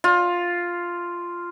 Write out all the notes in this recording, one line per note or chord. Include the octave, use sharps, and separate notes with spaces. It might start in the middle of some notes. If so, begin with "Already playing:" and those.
F4